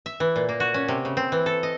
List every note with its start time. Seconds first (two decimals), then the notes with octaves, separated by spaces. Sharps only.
0.06 E5
0.20 E3
0.36 A#2
0.49 A#3
0.60 F#4
0.74 C#4
0.88 C3
1.05 C#3
1.17 C4
1.32 E3
1.46 A4
1.63 D#5